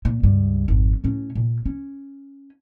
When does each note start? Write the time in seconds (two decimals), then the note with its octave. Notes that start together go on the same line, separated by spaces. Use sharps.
0.05 A#2
0.23 C#2 G2
0.68 G#1 F2
1.04 A2 C#4
1.35 A#2
1.66 C#4